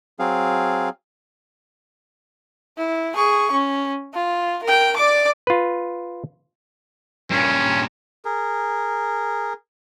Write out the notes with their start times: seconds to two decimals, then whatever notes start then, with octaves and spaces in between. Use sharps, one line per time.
0.19 F#3 C4 G#4 F5
2.78 E4
3.16 G#4 C#6
3.51 C#4
4.14 F4
4.63 A#4 G5
4.96 D5 D6
5.47 F4 B4
7.31 G2 A#2 C#4
8.25 G#4 A#4